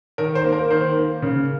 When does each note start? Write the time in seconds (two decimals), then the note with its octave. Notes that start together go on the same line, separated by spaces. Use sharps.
0.18 D#3 A#4
0.35 C5
0.44 A#3
0.53 A#4
0.70 D#3 C5
0.97 A#3
1.22 C#3